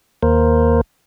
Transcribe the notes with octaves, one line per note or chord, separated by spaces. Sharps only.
D#2 A#3 A#4 C5